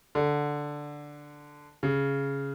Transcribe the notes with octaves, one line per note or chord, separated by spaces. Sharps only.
D3
C#3